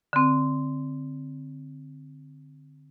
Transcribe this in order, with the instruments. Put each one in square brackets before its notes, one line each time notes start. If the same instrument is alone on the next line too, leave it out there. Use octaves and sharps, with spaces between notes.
[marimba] D3 C4